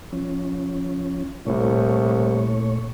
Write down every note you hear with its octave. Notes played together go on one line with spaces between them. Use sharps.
F3 C#4
C2 A#2 A3 C#5